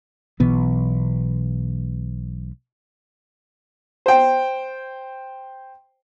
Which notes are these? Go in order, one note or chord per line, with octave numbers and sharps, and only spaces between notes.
B1 B2 E3 B3
C5 G5